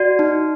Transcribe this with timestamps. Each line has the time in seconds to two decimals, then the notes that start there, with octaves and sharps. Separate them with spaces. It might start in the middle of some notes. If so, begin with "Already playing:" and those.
Already playing: F#4 D5
0.19 D#4